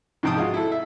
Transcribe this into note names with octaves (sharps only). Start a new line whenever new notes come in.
G#2 C3 F3 G5 A5 D#6
G#3 F4 F#4
E4 A4
E5